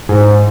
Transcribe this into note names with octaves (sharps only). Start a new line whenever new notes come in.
G#2